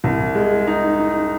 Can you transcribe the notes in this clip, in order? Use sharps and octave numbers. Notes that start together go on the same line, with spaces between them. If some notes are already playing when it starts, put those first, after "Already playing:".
C2
G#3
D#4
D#4